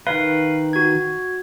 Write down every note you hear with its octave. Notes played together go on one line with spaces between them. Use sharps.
D#3 B4 F5
F#4 G#6